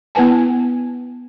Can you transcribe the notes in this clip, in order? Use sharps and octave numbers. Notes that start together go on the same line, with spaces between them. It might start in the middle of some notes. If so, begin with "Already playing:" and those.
B3 E4 B4 G#5 A5